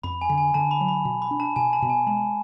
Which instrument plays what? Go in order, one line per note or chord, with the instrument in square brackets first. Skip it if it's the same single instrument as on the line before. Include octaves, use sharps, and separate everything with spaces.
[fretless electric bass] F2 [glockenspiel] B5
[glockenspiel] G#5
[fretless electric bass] D3
[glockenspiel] G#5
[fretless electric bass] D3 [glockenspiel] A5
[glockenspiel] B5
[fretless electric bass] F#3
[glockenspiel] B5
[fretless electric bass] B2
[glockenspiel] B5
[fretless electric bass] D4
[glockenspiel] A5
[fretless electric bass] B2 [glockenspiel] G#5
[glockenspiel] A5
[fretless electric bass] B2
[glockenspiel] G#5
[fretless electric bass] G#3 [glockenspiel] A5